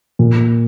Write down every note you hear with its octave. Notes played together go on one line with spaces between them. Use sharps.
A#2